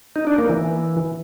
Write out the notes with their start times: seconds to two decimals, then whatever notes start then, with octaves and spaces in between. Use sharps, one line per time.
0.16 D#4
0.27 D4
0.38 A#3
0.49 E3